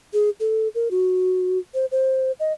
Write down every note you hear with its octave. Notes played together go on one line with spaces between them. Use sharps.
G#4
A4
A#4
F#4
C5
C5
D#5